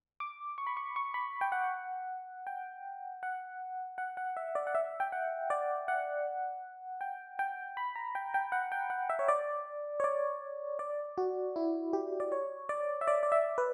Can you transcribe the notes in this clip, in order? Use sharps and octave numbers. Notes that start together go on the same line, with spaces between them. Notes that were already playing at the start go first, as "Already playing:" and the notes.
D6
C#6
B5
C#6
C#6
B5
G5
F#5
G5
F#5
F#5
F#5
E5
D5
F#5
E5
G5
F#5
D5
F#5
G5
G5
B5
A#5
G5
G5
F#5
G5
F#5
E5
C#5
D5
C#5
D5
D5
F#4
E4
G4
D5
C#5
D5
E5
D5
D5
E5
B4